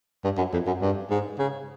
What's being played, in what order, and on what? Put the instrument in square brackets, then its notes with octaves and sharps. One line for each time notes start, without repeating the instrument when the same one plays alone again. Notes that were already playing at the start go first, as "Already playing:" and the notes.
[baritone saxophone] G2
F#2
F2
F#2
G2
G#2
C#3